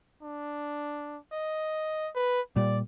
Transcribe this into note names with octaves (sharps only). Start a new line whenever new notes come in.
D4
D#5
B4
A#2 G3 D5